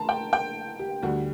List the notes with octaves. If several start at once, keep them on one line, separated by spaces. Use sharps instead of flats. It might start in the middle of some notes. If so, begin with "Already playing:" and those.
Already playing: A5 A#5 C6
G5
G5
G4
D2 D3 G3 F#4